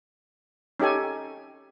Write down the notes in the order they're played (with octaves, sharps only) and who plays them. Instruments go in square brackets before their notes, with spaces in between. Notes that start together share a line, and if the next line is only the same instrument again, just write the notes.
[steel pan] C#4 D#4 G4 A4 G#5